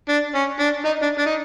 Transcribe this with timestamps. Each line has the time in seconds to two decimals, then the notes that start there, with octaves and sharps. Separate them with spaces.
0.09 D4
0.35 C#4
0.60 D4
0.85 D#4
1.02 D4
1.19 D4
1.26 D#4